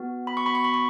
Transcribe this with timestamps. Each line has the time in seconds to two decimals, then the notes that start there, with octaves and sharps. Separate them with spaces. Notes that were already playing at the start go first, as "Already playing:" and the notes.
Already playing: B3 F#4
0.27 B5
0.37 C#6
0.46 B5
0.55 C#6
0.64 B5
0.74 C#6